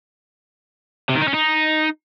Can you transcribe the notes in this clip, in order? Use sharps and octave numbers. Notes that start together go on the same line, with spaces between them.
C3
D#3
D#4
C#4
D#4